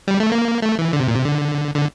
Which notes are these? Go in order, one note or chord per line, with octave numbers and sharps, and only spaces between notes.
G3
A3
A#3
A3
E3
D3
C3
A#2
C3
D3
D3